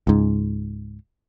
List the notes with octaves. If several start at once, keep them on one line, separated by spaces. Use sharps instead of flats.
C#2 G#2